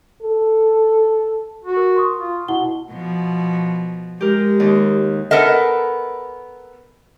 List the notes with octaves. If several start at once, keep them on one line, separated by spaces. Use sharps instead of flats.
A4
F#4
A#4
C6 C#6 D#6
F4
B2 E4 F#5 G7
B2 F3
G#3 G4 A#4
D#2
B3 A4 A#4 D#5